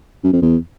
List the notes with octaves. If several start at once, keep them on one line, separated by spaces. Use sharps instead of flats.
F#2
F2
E2